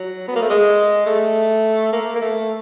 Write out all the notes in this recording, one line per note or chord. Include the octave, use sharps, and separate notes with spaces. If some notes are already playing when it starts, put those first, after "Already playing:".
Already playing: F#3
B3
A#3
A3
G#3
A3
A#3
A#3
A3